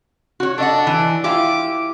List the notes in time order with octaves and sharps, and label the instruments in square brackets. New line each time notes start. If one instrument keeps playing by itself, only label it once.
[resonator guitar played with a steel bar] F#4 C#5
[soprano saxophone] D4 [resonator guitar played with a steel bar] A4 D#5 F#5
[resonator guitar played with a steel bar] E3
[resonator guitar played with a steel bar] E4 F4 G4 [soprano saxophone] D6